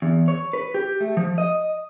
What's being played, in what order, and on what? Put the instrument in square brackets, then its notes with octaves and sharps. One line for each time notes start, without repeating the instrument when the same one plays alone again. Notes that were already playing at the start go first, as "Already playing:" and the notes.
[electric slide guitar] E2
C#5
B4
G4
A3
F3
D#5